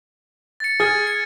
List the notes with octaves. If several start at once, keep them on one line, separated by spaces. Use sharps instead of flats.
A6 C#7
G#4 F6 G#6 A6
C#7